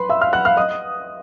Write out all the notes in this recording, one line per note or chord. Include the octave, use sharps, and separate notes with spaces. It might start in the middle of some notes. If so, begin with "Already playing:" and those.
Already playing: B4 B5 C6
E5 E6
F5 F6
F#5 F#6
F5 F6
D#5 D#6